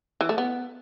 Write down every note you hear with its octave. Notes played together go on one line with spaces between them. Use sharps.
E3
A3
B3